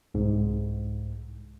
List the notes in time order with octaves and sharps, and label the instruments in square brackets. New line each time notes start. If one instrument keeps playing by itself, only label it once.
[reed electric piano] C2 G#2